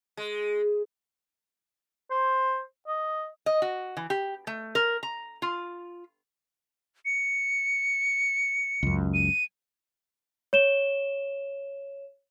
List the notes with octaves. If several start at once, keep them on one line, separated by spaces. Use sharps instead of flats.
G#3
C5
D#5
D#5
F#4
E3
G4
A3
A#4
A#5
F4
C#7
C#2 F#2
D#7
C#5 E7 G7